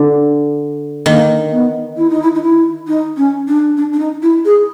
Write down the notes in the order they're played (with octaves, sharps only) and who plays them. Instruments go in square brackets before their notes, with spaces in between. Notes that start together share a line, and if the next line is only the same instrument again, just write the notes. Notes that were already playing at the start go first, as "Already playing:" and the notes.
Already playing: [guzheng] D3
[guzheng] D#3 [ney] A#3
[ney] B3
E4
D#4
E4
D#4
E4
D#4
C#4
D4
D4
D4
D#4
E4
G#4